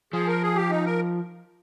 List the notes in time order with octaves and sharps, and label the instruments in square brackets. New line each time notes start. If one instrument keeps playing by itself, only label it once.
[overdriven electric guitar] F3 [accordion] G#4
[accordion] A#4
G#4
G4
D#4
A#4